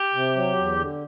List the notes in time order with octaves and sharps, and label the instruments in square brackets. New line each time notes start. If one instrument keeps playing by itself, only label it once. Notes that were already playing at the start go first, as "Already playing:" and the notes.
Already playing: [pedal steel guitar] G4
[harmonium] C3
F#3
E2
D3